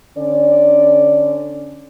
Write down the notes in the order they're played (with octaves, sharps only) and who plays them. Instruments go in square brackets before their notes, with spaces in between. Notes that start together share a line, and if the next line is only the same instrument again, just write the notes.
[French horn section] D3 C#4 D5